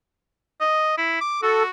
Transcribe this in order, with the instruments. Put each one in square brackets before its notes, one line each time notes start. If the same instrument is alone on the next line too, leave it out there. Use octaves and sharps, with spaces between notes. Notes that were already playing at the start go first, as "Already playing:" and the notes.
[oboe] D#5
E4
D6
[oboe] F#4 [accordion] A4